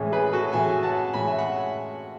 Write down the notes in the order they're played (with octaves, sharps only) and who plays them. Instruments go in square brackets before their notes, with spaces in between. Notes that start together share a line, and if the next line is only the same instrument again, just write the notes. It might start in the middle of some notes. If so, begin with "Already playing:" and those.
Already playing: [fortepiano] A2 E3 G#3 C#4
G#4 B4
F#4 A4
A2 E3 G#3 C#4 E5 G#5
F#5 A5
A2 E3 G#3 C#4 G#5 B5
E5
F#5